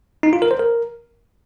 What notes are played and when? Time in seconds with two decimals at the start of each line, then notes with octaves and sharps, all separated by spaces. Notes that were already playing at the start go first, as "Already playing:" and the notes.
0.23 D#4
0.33 F4
0.42 A#4
0.51 C5
0.60 A#4